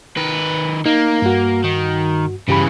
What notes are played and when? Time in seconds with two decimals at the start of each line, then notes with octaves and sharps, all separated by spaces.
0.17 D#3 B4
0.86 A#3 D#4
1.22 G2 F#4
1.64 D#3
2.48 G2 C#3 E3 G4 B5